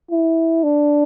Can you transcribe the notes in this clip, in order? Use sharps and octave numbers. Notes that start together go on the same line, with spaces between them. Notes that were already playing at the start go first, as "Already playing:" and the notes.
E4
D4